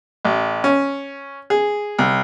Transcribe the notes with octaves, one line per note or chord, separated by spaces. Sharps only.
A1
C#4
G#4
C2